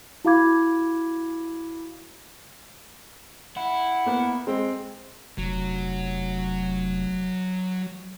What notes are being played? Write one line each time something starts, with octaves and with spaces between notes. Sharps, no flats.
E4 F#4 F5 B5 D6 G#6
E4 F#5
A#3 B3
G#3 C4
F1 F#3